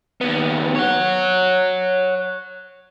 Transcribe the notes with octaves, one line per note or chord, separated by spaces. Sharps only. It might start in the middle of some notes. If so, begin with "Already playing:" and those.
D#2 B3
C#5 F#5